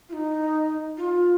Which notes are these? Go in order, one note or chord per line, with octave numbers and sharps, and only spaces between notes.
F4
D#4
F4